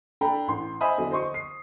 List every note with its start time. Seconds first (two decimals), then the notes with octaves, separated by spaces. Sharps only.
0.21 D4 A4 G5 A#5 B5
0.48 A1 C6
0.81 C5 D#5 E5 G#5 B5 D#6
0.97 E2 D3 F#3
1.11 C5 D#5 C6 C#6
1.34 C7